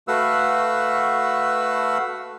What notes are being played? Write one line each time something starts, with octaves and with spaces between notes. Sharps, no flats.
A3 F#4 B4 F5 F#5 E6